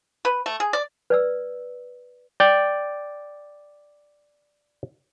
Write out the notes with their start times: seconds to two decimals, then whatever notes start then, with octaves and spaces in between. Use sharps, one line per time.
0.25 B4
0.46 A3
0.60 G#4
0.73 D5
1.10 B4 D5 E6
2.40 D5 G5